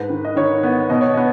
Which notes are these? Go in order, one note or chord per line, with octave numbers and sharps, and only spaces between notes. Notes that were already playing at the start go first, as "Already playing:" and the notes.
Already playing: G#2 B4
D#3
D#5
D#3 C#5
B3
B2 D#5
C#5
B3 D#5